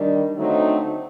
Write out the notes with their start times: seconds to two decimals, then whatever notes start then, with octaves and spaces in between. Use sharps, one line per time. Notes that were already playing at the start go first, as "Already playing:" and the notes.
Already playing: D#3 G3 D4
0.36 D3 F#3 A3 C4 D#4